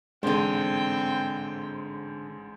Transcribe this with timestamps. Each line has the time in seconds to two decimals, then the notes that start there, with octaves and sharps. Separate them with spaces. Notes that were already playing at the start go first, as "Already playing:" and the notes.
0.23 A1 G#2 D3 G#3 C4 D4 C5 G5